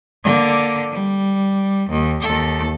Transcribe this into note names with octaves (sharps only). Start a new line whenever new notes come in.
D3 A#3
G3
D#2
D#2 A4